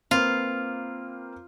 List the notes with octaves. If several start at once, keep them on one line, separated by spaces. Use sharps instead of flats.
A#3 C4 F4 B4